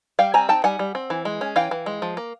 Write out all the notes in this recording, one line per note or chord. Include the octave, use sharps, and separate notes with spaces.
G3 F5 G5
C4 G#5 A#5
D#4 G5 A5
G3 F#5 G#5
G3
C4
E3
G#3
C#4
E3 F5 G5
E3
G#3
F3
A#3